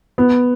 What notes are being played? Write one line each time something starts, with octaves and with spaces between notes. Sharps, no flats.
B3